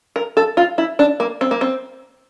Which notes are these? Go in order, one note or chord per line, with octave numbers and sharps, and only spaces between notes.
A#4
A4
F4
E4
D4
A#3
C4
A#3
C4